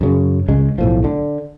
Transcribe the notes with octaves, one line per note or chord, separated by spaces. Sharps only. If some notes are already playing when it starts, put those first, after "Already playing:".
F#2 C#3
C#2 C#3 G#3
B1 A2 F3
D3